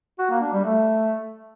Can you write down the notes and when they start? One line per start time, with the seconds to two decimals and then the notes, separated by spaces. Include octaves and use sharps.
0.19 F#4
0.30 A#3
0.41 D4
0.53 G3
0.64 A3